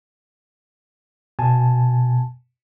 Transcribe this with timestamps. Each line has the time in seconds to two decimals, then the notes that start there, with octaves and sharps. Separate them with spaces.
1.39 B2 G#5 A5